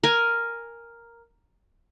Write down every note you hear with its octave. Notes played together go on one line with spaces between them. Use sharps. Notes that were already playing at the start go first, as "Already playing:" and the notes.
A#4 G#5